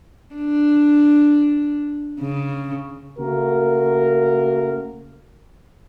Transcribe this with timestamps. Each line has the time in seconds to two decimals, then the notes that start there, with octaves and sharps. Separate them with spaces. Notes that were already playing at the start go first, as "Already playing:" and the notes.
0.35 D4
2.20 C#3
3.19 C#3 A3 A#3 F#4 A#4